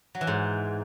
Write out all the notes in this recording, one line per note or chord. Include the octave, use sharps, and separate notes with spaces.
F#3
E3
G#2